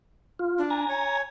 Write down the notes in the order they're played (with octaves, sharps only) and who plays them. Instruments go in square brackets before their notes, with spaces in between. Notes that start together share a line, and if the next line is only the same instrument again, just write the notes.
[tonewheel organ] F4
[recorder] D4
[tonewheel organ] G#5 A#5
[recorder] C#5